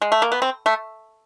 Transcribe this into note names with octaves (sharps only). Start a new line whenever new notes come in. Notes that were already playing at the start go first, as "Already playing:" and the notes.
G#3
A3
A#3
B3
C4
A3